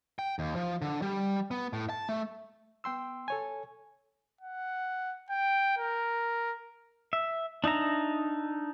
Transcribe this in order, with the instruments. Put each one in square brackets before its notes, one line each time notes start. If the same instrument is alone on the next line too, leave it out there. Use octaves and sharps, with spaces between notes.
[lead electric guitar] G5
D#2
F3
D3
G3
B3
A2
A5
A3
[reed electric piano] B3 G5 C6 E6
A4 C#5 G#5
[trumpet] F#5
G5
A#4
[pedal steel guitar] E5
D4 D#4 E5 A#5